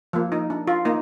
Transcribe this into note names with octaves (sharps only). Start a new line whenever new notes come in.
F3 A#3
D#4
D4
F4
A#3 D#4